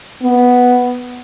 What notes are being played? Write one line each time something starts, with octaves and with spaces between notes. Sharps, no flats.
B3